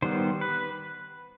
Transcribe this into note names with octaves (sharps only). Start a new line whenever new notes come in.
D#3 G3 B3 C5
B4